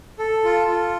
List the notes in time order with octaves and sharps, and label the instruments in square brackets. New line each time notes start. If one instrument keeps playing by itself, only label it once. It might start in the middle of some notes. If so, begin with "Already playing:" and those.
[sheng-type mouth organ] A4
F4
F4